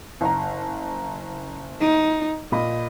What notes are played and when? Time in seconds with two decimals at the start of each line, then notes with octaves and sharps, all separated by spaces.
0.21 F#1 A#5
1.81 D#4
2.52 A#2 D#5 B5